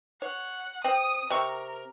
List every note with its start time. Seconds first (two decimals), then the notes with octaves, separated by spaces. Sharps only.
0.22 C#5 F#5
0.84 C4 D#6
1.30 C3 A#4 C#6